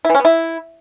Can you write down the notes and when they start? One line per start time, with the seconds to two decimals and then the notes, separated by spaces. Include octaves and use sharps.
0.05 E4
0.10 E3
0.15 C#4
0.20 B3
0.25 E4